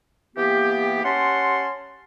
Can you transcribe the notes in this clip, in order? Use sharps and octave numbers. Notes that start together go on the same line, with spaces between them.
E3 A#3 B3 G4
C#4 G4 F#5 A5 C6